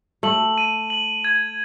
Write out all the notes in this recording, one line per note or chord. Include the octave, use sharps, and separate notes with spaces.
A3 F#7
D#7
F#7
G#6